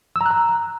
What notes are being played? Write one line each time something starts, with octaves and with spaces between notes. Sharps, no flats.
E6
A#5
F#6
A#5